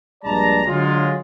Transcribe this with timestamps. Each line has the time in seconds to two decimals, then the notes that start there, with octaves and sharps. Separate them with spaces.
0.24 A#1 G2 G#3 D5 A5 A#5
0.67 D3 F#3 G#3 F4